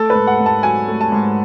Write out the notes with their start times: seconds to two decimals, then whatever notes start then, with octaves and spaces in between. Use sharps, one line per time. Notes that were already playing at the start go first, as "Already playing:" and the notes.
Already playing: A3 A4
0.10 G#2 B4
0.27 F#5
0.40 G#2
0.46 A5
0.63 F#3 G#5
0.88 A3
1.01 A5
1.12 G#2